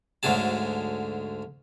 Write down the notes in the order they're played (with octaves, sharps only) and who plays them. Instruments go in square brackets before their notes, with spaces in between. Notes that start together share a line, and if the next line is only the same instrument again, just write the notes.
[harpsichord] D2 G#2 D3 F#3 G#4 A5